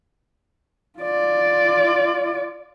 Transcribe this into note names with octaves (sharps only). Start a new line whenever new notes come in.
F4 D5